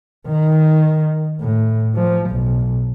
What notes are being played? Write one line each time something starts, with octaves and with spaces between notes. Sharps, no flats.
D#3
A2
F3
B1